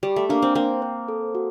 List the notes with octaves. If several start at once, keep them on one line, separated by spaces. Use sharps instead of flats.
G3 G4
A3
A#3 D4
C4
A#3 G5
C5
A4
F#4